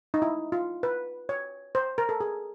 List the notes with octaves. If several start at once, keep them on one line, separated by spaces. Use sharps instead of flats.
D#4
E4
F4
B4
C#5
C5
A#4
A4
G#4